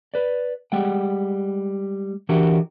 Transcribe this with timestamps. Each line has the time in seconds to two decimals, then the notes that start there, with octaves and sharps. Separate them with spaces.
0.14 B4 D5
0.72 G3 G#3 F#5 G5
2.29 D3 E3 D4 F#4 G4 A#4